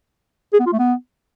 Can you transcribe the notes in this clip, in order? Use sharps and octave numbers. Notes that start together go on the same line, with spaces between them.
G#4
B3
F4
A3
B3